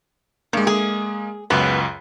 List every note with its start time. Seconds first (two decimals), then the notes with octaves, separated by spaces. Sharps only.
0.53 G2 G#3 A#3
0.67 G#4
1.50 C#2 F#2 B3